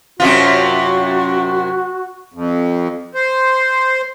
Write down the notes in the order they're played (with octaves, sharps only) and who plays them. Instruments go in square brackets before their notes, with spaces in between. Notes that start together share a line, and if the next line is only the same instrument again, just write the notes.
[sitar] F#2 C3 F4 [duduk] F#4
[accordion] F2
C5